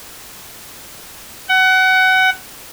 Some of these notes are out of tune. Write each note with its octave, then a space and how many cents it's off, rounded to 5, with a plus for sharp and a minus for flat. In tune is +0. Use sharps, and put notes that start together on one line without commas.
F#5 +25